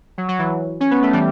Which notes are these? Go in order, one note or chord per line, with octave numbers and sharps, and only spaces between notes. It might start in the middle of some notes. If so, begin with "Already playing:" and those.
F#3
F#3
E3
C#4
B3
A3
E3 G3